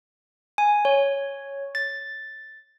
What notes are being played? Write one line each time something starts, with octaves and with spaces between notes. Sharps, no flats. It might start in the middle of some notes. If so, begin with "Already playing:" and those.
G#5
C#5
A6